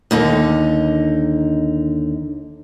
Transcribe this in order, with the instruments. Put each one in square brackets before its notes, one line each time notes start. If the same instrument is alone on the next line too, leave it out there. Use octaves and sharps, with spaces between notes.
[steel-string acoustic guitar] D#2 D3 D#4